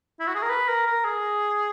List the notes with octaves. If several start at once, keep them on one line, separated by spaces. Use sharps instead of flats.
E4
F#4
G#4
A#4
B4
A#4
A#4
G#4